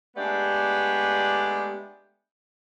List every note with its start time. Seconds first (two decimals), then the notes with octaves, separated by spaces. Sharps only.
0.16 G#3 A3 B3 D4 G4 D5